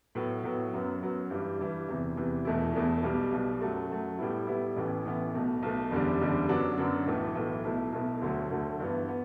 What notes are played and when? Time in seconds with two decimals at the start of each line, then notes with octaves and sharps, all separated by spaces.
0.15 A2 F#3 B3
0.44 A2 F#3 B3
0.73 F#2 F#3 B3
1.01 F#2 F#3 B3
1.30 G2 E3 G3
1.59 G2 E3 G3
1.88 E2 C3 E3
2.17 E2 C3 E3
2.45 E1 E2 B2 A3 E4
2.74 E1 E2 B2 A3 E4
3.03 B1 B2 G3
3.32 B1 B2 G3
3.61 F#2 F#3 A3
3.89 F#2 F#3 A3
4.18 A2 G3 B3 E4
4.47 A2 G3 B3 E4
4.76 A1 A2 E3 B3
5.05 A1 A2 E3 B3
5.34 B1 B2 A3
5.63 B1 B2 A3
5.91 F#1 E2 D3 G3 D4
6.21 F#1 E2 D3 G3 D4
6.49 F#2 D3 F#3 B3 D4
6.78 F#2 D3 F#3 B3 D4
7.07 B1 A2 E3 A3
7.35 B1 A2 E3 A3
7.64 B1 B2 A3 E4
7.93 B1 B2 A3 E4
8.21 D2 D3 F#3 A3
8.51 D2 D3 F#3 A3
8.80 G2 E3 B3
9.08 B3